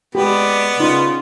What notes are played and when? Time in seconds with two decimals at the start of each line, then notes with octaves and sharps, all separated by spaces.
0.15 G#3 B3 G4 D5 B5
0.80 C#3 D#4 F4